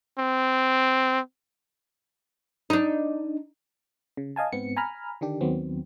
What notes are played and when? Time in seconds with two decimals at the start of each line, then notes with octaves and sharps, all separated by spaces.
0.19 C4
2.70 D4 D#4
4.17 C#3
4.36 D#5 F5 G#5 A5
4.53 G#2 B3 C4 C#7
4.77 G#5 A#5 B5 F6
5.21 D3 D#3 D4 G4
5.41 D#2 D#3 F#3 B3 C4